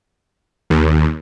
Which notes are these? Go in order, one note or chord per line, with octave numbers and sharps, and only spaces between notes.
D#2